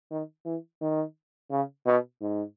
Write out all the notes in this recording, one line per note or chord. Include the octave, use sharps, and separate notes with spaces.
D#3
E3
D#3
C#3
B2
G#2